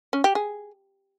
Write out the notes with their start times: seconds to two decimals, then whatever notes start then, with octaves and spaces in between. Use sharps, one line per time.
0.13 C#4
0.24 G4
0.35 G#4